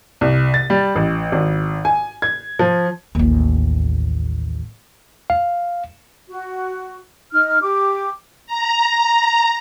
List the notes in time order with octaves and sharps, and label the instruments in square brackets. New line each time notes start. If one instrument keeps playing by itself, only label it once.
[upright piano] C2
A6
G3
A1
G#1
G#5
G#6
F3
[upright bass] A1 D#2
[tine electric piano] F5
[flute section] F#4
D#4 F6
G4 D6
[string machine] A#5